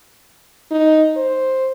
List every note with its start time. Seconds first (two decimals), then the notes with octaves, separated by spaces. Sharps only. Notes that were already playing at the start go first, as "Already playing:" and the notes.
0.71 D#4
1.17 C5